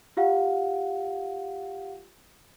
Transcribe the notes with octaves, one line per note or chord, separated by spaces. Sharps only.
F4 G4 F5 F#5